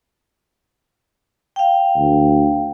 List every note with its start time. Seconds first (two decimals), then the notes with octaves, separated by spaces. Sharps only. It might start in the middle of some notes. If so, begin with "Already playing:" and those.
1.56 F5 G5
1.97 D2